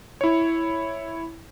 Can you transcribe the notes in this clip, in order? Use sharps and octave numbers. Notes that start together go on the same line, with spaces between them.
E4 C#5